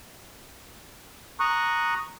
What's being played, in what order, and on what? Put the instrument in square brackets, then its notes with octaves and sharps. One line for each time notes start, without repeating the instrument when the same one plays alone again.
[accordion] A#5 C#6 D#6 F#6